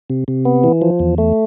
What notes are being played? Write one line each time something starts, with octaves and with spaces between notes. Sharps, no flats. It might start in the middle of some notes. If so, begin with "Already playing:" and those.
C3
C3
B3
E3
F3
E2
A3